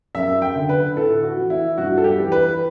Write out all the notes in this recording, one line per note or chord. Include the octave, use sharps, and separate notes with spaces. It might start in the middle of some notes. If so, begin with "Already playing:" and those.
F#2 E5
G5
D3
B4
A2 A4
F#4
E3
E4
G2 F#4
A4
G4
E3
B4